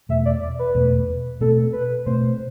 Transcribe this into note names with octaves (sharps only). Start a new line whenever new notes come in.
E2 B2 A3 E5
D5
D5
B4
E2 B2 A3
B2 A3 C4 A4
B4
B2 A3 C4 C5